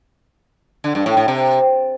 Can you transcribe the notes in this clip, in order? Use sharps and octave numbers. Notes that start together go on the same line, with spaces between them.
D3
G2
A2
A2
C3